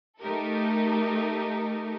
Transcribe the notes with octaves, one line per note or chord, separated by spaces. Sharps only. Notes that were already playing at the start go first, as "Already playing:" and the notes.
A3 D#4 G4 A4 A#4